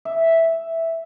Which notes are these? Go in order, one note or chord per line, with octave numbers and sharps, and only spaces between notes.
E5